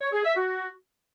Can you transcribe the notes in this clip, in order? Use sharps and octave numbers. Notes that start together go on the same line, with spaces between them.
C#5
G#4
E5
F#4